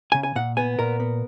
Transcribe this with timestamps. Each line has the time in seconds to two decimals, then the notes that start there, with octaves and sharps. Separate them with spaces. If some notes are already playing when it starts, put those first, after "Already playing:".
0.12 C#3 G#5
0.23 G#5
0.36 A#2 F#5
0.57 B3 G#5
0.79 A#2 A#4
1.00 B3